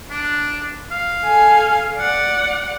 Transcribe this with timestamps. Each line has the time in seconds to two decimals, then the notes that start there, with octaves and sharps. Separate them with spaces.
0.11 D4
0.91 F5
1.24 A4 G#5
1.97 D5 F#5